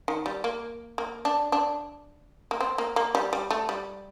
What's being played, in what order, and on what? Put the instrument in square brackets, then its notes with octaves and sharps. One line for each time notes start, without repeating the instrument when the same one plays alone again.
[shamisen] D#3
G3
A#3
A#3
D4
D4
A#3
C4
A#3
A#3
G3
G3
A3
G3